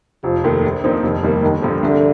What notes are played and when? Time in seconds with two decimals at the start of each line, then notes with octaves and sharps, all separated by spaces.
0.24 F1 F3
0.44 D#2 D#3 A3
0.64 A#1
0.84 A#2 F3 C4 D#4
1.03 F1 D#3
1.23 D#2 D#3 G3 A#3
1.43 G1 D#3
1.62 G2 D3 F3
1.83 C2 D3